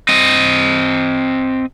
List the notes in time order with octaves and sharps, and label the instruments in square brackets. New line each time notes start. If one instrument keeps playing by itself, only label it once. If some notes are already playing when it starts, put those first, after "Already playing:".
[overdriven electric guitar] C4 D#5